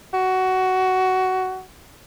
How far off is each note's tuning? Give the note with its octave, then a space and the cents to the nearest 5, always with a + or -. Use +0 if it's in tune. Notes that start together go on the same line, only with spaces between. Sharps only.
F#4 +15